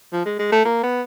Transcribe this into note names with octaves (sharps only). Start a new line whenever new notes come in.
F3
G#3
G#3
A3
A#3
B3